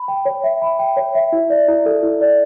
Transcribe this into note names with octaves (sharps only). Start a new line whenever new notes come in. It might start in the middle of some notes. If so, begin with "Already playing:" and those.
Already playing: B5
G5
C#5
E5
B5
G5
C#5
E5
E4
D5
E4
A4
E4
D5